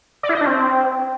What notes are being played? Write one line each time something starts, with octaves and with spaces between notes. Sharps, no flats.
D5
E4
D#5
D4
C4